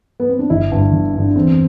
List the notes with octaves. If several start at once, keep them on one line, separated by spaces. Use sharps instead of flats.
B3
C4
D4
G1 E4
G2 D3
G1
G2 D3
D4
E2 C4